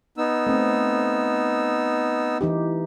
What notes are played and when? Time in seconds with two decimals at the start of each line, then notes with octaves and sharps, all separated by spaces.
0.18 B3 D#4 E6
0.47 A3 C4
2.41 E3 D#4 G4